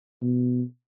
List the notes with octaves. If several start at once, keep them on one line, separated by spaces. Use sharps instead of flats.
B2